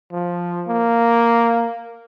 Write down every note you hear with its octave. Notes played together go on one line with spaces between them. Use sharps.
F3
A#3